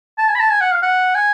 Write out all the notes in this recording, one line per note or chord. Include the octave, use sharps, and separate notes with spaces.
A5
G#5
B5
A5
G#5
F#5
F5
F#5
G#5